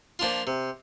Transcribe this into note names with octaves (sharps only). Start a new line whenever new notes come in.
F3 A#3 D4 F4
C3